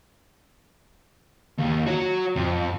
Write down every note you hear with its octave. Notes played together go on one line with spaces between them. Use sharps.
D#2
F#4 C#5
F2